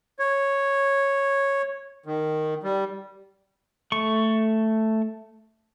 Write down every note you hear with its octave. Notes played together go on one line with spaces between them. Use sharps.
C#5
D#3
G3
A3 C#6